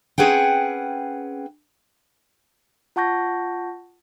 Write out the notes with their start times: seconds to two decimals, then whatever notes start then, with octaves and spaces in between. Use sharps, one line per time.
0.18 C4 C#4 G#4 B4 F#5 G5
2.96 F4 F#5 A5 C#6 G6 A#6